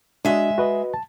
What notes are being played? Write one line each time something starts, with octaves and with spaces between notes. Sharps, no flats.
G#3 D4 F#4 D#5 E5
F#4 B4 D#5
A5